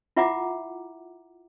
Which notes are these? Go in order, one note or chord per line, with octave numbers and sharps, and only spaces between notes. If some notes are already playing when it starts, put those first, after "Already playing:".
E4 F4 E5 F#5 A#5 D6